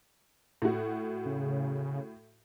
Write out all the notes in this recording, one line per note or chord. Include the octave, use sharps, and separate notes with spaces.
A2 F#4
C#3